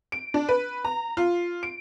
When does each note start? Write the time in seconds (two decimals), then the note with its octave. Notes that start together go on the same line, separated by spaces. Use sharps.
0.12 D7
0.34 D4
0.49 B4
0.85 A#5
1.17 F4
1.63 D7